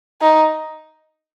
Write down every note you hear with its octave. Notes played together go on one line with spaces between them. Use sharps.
D#4